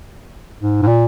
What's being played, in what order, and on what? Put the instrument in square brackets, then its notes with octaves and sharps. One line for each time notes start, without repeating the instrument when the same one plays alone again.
[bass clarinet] G#2
G#2
A#2